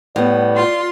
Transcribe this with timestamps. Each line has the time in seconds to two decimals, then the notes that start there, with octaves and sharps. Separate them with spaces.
0.16 A2 G3 B3 D5
0.56 F4 C6